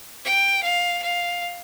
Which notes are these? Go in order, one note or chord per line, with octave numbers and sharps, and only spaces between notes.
G5
F5
F5